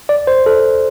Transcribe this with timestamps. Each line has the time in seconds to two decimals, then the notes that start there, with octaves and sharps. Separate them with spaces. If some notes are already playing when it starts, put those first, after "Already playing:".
0.09 D5
0.27 C5
0.46 A4